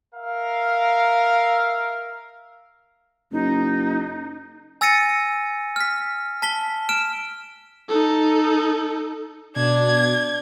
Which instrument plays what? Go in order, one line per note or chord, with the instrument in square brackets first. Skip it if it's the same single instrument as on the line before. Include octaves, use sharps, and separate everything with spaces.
[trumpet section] A#4 E5 F5
[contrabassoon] F#1 [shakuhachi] D#4
[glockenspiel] G#5 E6 A6 A#6 C#7 D#7
F6 B6
A5 B6 G7
F6 D7 E7
[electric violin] D#4 A4
[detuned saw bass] B2 [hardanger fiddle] D4 [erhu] G#6